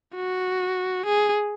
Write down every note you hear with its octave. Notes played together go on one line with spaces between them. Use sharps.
F#4
G#4